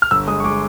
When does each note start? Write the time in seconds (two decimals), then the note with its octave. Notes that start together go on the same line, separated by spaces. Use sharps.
0.02 F6
0.11 G1 E6
0.28 G#3 D#6
0.40 C#6
0.44 G#3 D6